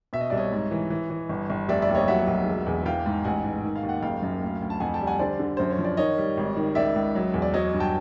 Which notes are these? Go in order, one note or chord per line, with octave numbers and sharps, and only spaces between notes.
B2 E5
D#5
C2 D5
C#5 D#5
G#2
E3
E3
E3
G1
G1
F1 D5 E5
D5 E5
D#2
C#5 D#5
F#3 E5 F#5
B1
E1
E2
E3 F5 G5
G#2
A1 F#5 G#5
G#2
D#3
F5
D#2
F#5
F#1 F5 G5
F#2
D2
D2
A5
F2 F#5 G#5
G5 A5
G3
F#5 G#5
D3 C5 D5
D3
F#2 C5
C#5
F3
D5
D#3 C#5 D#5
G3
G#1
D#3
C#2 D5 E5
C#2
F#3
E2
D5
F#3 C#5 D#5
G2
G5 A5